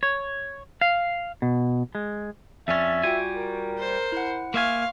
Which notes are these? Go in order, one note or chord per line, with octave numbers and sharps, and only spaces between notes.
C#5
F5
B2
G#3
F2 C#4 D5 E5 G#5 A6
G3 F4 F#4 G5 G#5
A#4
C5
E4 F#5
A#3 E5 F5 G#5 C6 C#6 F6